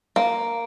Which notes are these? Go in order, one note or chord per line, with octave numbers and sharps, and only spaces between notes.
A#3